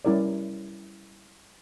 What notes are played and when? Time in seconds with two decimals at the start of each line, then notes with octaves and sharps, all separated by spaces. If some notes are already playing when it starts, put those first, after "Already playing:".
0.05 G3 C#4 E4 A#4 D5